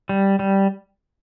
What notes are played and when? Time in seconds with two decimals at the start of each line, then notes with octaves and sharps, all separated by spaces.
0.09 G3
0.39 G3